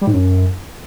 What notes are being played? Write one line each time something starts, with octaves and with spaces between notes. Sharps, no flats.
G3
G#2
F#2